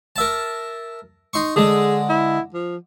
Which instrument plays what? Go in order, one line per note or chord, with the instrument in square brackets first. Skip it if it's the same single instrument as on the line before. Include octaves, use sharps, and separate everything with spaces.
[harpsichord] A#4 E5 A5
D#4 C6 C#6
[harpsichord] D3 G#3 [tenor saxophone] G#4
[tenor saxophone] E4
F3